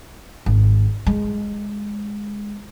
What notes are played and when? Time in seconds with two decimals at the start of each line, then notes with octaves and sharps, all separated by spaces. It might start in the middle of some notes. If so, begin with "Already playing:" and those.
0.46 G#1
1.07 G#3